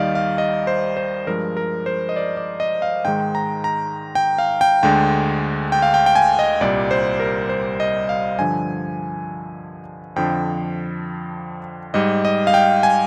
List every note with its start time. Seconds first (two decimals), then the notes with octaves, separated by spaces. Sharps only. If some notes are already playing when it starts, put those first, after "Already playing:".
Already playing: D#2 D#3 G3 D5 D#5 F5
0.15 F5
0.38 D#5
0.67 C5
0.97 C5
1.27 G2 F3 G#3 A#4
1.57 A#4
1.86 C5
2.09 D#5
2.16 D5
2.37 D5
2.60 D#5
2.82 F5
3.05 G#2 D#3 G#3 G5
3.35 A#5
3.64 A#5
4.15 G5
4.38 F5
4.61 G5
4.83 D2 D3 G#3 G5
5.72 G5
5.82 F5
5.94 G5
6.06 G5
6.15 G#5
6.39 D#5
6.61 C2 A#2 G3 D5
6.91 C5
7.20 A#4
7.49 C5
7.80 D#5
8.09 F5
8.38 G2 D3 F3 G#5
10.16 F2 D3 F3 G5
11.94 G#2 G3 D#5
12.25 D#5
12.47 F5
12.54 G5
12.83 G#5